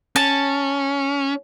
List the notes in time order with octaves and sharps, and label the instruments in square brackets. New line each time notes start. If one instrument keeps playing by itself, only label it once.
[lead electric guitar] C#4 [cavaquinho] A5